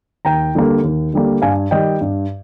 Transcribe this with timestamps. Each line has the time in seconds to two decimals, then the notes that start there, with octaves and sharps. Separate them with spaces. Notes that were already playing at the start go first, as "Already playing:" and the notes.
0.25 D#2 G5 A#5
0.55 D3 G3 A#3
0.84 D#2
1.14 D3 G3 A#3
1.42 G2 F5 G#5
1.71 D#3 G3 D#5 G5
2.01 G2